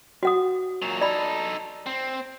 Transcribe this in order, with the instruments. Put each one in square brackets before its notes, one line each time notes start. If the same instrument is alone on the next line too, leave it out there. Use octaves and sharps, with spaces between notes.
[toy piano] F#4 F#5 D#6
[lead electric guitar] A#2 F#3
[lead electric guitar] D#4 A4 [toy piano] D5 B5
[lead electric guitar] C4